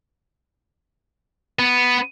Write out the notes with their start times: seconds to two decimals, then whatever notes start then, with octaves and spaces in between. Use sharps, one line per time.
1.59 B3